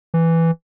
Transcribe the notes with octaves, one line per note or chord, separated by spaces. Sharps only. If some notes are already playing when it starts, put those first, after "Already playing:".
E3